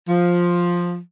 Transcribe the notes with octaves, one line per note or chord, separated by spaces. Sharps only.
F3